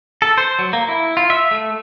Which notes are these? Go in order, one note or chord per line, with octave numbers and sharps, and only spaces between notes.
A4
C5
F#3
A#3
E4
F4
E5
A3